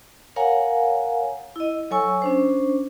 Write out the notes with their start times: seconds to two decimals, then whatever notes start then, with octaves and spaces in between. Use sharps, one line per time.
0.36 A#4 C#5 F5 F#5 G#5 A#5
1.56 E4 D#5
1.91 F#3 A4 C#5 G#5 C#6 E6
2.22 C#4 D4 C5